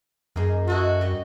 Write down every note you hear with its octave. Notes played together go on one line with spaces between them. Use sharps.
F#2 A#3 D#4 G#4
E4 F#4 A4 D#5
G3 D#4